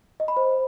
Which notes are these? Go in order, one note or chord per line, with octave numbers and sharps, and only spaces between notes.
D#5
B5
C5